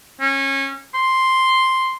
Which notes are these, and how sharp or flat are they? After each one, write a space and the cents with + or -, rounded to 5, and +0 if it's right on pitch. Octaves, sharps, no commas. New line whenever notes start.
C#4 -25
C6 +0